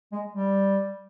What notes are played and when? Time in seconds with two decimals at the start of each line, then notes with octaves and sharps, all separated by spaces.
0.12 G#3
0.33 G3